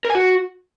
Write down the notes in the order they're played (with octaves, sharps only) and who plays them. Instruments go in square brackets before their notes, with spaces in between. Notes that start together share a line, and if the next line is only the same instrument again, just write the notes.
[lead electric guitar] A#4
G#5
F#4